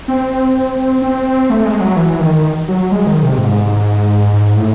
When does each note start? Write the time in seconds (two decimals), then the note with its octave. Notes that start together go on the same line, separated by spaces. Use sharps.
0.08 C4
1.02 C4
1.50 A3
1.66 G#3
1.81 F#3
1.96 E3
2.21 D#3
2.68 F#3
2.92 G#3
3.07 D#3
3.23 C3
3.38 G#2
4.33 G#2
4.56 A2